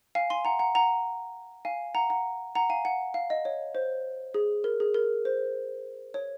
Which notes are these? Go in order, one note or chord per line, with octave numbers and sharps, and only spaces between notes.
F5 G#5
G#5 C6
F#5 A#5
F#5 A#5
F#5 A#5
F5 G#5
F#5 A#5
F#5 A#5
F#5 A#5
F5 G#5
F#5
F5
D#5
C#5
C5
G#4
A#4
G#4
A#4
C5
C#5